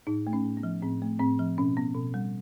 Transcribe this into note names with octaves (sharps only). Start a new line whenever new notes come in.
A2 D#4
A3
C#4
A2
B3
F3
A2 C4
A3
A2 C4
F3
B2 C#4
B3
B2
G3